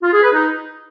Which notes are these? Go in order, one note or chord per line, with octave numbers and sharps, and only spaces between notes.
F4
G#4
B4
D#4